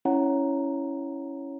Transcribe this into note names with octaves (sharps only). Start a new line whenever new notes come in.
C#4 E4 C#5 F#5 A#5